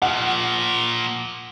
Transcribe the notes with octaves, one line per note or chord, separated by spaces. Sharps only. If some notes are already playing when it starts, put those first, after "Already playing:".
A#2 F3 F#5